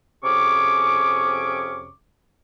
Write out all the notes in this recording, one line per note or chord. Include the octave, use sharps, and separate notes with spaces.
F2 C3 C#4 G#4 C#6 D6